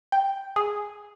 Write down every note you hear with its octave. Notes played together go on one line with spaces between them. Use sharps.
G5
G#4